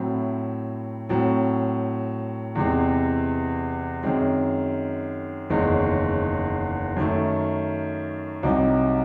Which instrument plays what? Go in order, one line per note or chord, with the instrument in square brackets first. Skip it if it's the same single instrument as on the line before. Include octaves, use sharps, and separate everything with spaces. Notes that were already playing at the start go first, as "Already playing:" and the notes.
Already playing: [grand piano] A2 F#3 C4 E4
A2 F#3 C4
E2 C3 E3 G#3 C4
F#2 D#3 G#3 C4
F#1 E2 D#3 G#3 C#4
F#2 D#3 A3
C2 C3 F#3 C4 D#4